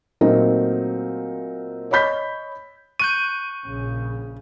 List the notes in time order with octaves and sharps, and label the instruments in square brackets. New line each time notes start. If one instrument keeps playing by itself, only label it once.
[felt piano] A#2 F#3 A3 C4 D#4 A#4
C#5 D#5 B5 G6 B6
[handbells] C#6 F#6 G6 [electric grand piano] D#7
[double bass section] A#1 C#3